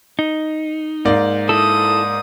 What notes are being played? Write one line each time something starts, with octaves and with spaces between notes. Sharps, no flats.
D#4
G#2 A#3 D5
E4 A4 D#6